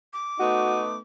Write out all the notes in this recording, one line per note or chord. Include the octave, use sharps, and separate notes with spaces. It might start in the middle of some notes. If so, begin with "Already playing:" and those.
D6
A3 B3 D#4 F#4